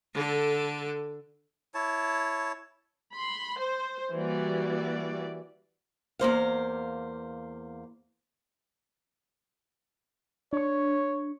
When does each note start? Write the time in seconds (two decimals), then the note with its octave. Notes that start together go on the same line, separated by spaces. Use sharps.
0.15 D3 A4
1.74 E4 C#5 A5
3.13 B5 C6
3.59 C5
4.13 E3 G3 A#3 F#4 D5
6.19 E2 A#3 C5 F5
10.53 D4 C#5 C#6